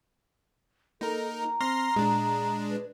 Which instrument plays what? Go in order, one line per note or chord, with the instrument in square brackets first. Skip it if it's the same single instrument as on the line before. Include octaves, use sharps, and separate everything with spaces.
[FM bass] A#3 [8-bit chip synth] D#4 A#4 [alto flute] A4
[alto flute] A#5
[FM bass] C4 [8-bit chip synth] C6 F6 A#6
[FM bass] A#2 [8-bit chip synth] G#3 D4
[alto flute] B4